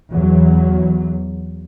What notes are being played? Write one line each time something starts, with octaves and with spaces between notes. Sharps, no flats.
E2 F#3